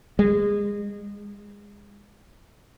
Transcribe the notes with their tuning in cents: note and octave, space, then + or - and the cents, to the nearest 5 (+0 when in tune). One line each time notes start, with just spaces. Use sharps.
G#3 -25